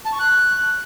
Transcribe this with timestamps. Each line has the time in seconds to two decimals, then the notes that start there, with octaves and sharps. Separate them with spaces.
0.05 A5
0.12 C#6
0.19 F#6